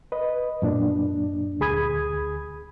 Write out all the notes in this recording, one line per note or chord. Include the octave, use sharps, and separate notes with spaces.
B4 D#5
F#2 A#2 D4
D2 G#4 B5 D#6 G#6